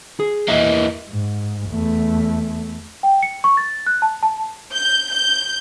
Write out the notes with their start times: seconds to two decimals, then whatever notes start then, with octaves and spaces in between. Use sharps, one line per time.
0.20 G#4
0.48 E2 E3 A#3 D#5 E5
1.09 G#2
1.70 E2 A3
3.03 G5
3.23 C#7
3.44 C#6
3.57 A6
3.87 F#6
4.02 A5
4.23 A5
4.73 G6
5.11 G6